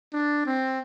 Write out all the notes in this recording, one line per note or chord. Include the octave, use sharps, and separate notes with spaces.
D4
C4